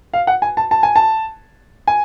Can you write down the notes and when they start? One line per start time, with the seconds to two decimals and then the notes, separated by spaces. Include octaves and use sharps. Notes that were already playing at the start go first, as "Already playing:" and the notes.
0.13 F5
0.27 F#5
0.42 G#5
0.57 A5
0.71 A5
0.83 G#5
0.96 A5
1.87 G#5